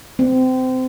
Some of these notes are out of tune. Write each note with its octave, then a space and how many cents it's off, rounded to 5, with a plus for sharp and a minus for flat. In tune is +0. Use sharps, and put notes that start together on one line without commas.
C4 -25